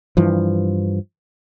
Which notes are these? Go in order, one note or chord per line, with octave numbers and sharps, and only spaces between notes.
G2 E3 F3